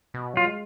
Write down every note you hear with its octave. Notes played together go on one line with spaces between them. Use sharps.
B2
F#3 F4
G#3